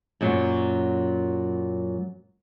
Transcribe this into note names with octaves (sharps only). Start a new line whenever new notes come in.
F#2 A#2 F#3